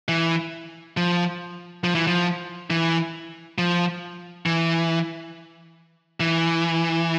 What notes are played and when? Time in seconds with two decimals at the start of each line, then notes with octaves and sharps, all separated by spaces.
0.08 E3
0.97 F3
1.84 F3
1.95 E3
2.07 F3
2.70 E3
3.58 F3
4.46 E3
6.20 E3